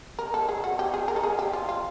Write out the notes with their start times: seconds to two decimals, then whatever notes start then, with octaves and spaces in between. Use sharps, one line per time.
0.19 A#4
0.34 A4
0.49 G#4
0.64 F#4
0.79 G4
0.94 G#4
1.08 A#4
1.16 A4
1.23 G#4
1.39 G4
1.53 F4
1.69 F4